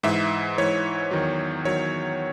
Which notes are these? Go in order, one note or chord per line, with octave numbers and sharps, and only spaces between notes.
G#2 E3 E5
G#2 E3 C#5
E2 D#3 F#3
E2 D#3 F#3 C#5